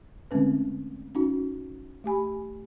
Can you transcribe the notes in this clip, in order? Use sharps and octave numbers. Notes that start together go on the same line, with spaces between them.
D3 G#3 A3 C4 C#4 B4
C#4 D#4 F#4
A3 G4 G#5 B5